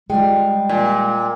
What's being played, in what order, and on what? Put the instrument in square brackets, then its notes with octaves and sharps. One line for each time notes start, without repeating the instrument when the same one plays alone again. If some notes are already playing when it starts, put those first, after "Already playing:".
[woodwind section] G3 [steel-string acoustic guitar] G#3 F4 [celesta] G5
[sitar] A#2